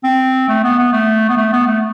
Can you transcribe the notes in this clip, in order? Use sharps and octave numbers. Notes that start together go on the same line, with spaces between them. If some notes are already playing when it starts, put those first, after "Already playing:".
C4
A3
B3
B3
A3
B3
A3
B3
A3